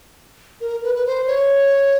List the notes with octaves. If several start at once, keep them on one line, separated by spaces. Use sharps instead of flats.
A#4
B4
B4
C5
C#5